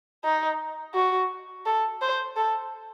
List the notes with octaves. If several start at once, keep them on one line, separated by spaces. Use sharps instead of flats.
D#4
F#4
A4
C5
A4